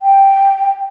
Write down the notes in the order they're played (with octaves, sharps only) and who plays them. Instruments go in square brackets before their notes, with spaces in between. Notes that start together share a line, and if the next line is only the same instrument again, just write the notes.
[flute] G5